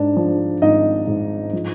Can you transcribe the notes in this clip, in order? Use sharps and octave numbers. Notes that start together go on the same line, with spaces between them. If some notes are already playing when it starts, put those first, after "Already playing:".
Already playing: G#2 D4
F3
G#1 D#4 D#5
G#2
F3